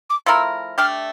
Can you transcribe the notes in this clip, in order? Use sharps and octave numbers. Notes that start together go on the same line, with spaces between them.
D6
F3 A3 E4 A#4 E6
A3 D4 G4 F6